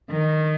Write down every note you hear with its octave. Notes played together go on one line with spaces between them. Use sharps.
D#3